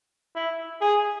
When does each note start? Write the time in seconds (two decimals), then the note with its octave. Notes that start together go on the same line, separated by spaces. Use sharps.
0.35 E4
0.81 G#4